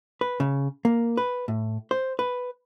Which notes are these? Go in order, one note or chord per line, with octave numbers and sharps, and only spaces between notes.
B4
C#3
A#3
B4
A2
C5
B4